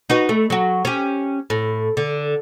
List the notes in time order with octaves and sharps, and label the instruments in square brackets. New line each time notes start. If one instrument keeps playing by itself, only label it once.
[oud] D#4 F#4 B4
A3
F#3 F#4
C#4 G4
A2
D3